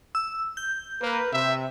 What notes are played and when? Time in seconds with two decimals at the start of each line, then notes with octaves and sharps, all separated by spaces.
0.15 E6
0.57 G6
1.02 A#3 A#4 B4
1.33 C3 E5